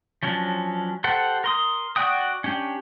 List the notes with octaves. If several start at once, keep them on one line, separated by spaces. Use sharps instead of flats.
F3 F#3 C#4 D4
G4 A4 C5 F#5
A#4 C6 D#6
F#4 D5 F#5 G5 D#6
C#4 D4 G4